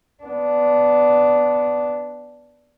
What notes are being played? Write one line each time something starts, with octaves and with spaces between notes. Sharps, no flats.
B3 D4